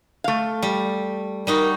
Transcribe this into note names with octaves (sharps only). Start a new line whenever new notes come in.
A3 F5
G3
G3 D#4 F#4 A#4